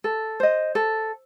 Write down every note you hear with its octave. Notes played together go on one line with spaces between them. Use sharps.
A4
C5 D#5
A4